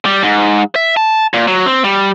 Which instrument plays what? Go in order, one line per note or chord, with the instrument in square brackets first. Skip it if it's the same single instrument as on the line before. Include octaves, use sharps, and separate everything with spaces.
[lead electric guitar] G3
G#2
E5
A5
A#2
F#3
C4
G3